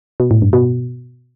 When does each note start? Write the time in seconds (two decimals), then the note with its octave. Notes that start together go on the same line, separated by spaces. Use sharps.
0.20 B2
0.31 A2
0.42 G2
0.53 B2